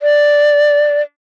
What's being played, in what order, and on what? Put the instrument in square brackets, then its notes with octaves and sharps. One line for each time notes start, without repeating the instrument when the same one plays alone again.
[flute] D5